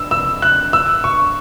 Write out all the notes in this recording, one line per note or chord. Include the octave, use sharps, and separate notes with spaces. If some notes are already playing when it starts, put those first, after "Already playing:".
Already playing: E6
E6
F#6
E6
C#6